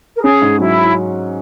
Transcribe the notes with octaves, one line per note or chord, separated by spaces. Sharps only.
A#4
C#4 G#4
G#2
F#3 E4